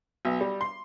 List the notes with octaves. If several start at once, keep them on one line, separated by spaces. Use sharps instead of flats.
B1
G3
C6